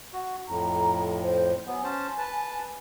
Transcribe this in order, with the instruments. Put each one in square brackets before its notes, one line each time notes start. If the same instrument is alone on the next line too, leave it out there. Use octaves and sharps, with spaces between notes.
[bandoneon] F#4
[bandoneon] F2 A2 [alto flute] A#5
[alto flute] C5
[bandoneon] F#3 B3 [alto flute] G#5
[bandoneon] C#4 C5 A5
B4 A5